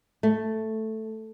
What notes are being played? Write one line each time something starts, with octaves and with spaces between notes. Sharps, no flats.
A3